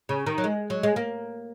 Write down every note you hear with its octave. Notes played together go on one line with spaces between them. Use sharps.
C#3
D#3
F#3
G#3
F#3
G#3
A#3